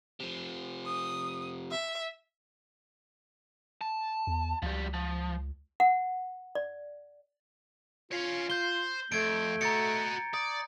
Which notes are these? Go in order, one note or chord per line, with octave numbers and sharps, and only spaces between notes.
C3 F3
D#6
E5
A5
E2
C#2 F3 G3
F3
F#5
D5
F4 C#5 F5
C5 G6 G7
F2 A3 G#6 D7
F#4 D#5 A#5 A6 C#7
D5 D#6